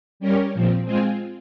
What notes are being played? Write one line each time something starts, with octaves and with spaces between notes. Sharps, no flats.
G3 C#4 G4 A#4 C#5
A#2 F3 C4
G#3 C4 F4 G#4